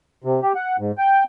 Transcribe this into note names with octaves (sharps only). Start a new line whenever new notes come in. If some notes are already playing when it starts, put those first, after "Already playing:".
C3
G4
F#5
G#2
G5